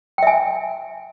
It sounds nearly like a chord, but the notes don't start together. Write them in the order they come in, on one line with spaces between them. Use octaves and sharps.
G5 E5 G#5